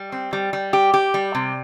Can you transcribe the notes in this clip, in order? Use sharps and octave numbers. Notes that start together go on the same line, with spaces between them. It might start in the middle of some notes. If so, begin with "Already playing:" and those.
Already playing: G3
C4
G3
G3
G4
G4
G3
C3